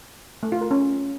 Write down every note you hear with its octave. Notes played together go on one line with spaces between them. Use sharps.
A3
F4
A#4
C#4